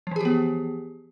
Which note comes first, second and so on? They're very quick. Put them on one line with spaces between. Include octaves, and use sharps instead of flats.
F3 E3 G#4 G4 B3